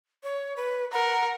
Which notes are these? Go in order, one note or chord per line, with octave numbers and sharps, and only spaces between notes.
C#5
B4
A#4 F#5